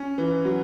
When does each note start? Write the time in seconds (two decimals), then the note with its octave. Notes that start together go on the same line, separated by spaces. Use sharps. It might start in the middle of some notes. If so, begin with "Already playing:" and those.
Already playing: C#4
0.18 E3
0.45 F#3